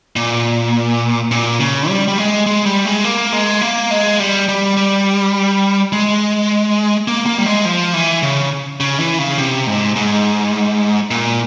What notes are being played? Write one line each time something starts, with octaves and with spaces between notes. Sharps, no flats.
A#2
A#2
C#3
G3
G3
G#3
G#3
G3
G#3
A#3
G#3
A#3
G#3
G3
G3
G3
G#3
A#3
A#3
G3
G#3
F3
E3
C#3
C#3
E3
C#3
C3
G#2
G#2
A#2